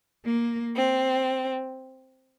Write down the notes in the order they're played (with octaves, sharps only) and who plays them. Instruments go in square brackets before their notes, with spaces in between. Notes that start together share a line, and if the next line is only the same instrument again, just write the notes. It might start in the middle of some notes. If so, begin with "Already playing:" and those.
[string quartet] A#3
C4